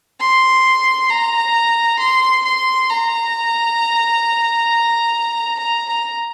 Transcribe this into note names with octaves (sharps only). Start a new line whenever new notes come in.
C6
A#5
C6
C6
A#5
A#5
A#5